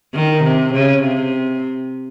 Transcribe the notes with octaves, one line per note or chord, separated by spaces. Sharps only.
D#3
C3
C#3
C3